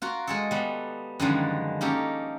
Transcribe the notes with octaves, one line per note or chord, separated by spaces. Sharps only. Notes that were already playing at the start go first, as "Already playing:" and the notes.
F4 F#4 A#4
G#3 G#4 A4
G3 B3
F#2 D3 D#3 F3 G3 G#3
A#3 C#4 D#4 G4 A4